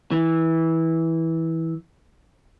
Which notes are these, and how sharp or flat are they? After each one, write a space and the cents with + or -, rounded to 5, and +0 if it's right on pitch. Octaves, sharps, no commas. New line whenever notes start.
E3 -15